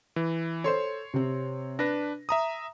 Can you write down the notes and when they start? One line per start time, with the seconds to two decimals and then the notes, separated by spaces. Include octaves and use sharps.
0.16 E3
0.64 A4 C5 C#5 C6
1.14 C3 C4
1.79 D4 B4 A#6
2.29 E5 A#5 D#6